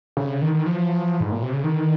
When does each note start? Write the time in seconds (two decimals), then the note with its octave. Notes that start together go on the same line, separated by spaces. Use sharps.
0.17 C#3
0.42 D#3
0.54 D#3
0.66 F3
1.21 G#2
1.32 A#2
1.42 C3
1.53 C#3
1.64 D#3